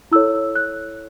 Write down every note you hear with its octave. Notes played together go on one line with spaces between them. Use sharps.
E4 A4 C#5 E6
F#6